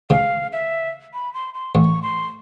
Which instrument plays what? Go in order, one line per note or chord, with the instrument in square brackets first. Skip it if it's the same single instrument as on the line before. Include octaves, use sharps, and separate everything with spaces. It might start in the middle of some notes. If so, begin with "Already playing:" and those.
[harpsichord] C#2 C#3 [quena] F5
[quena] E5
B5
C6
C6
[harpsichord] A1 A2 [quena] C#6
[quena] C6